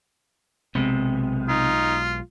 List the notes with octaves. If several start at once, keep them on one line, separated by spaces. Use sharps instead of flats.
B1 C3 G#3 B3
D#4 F4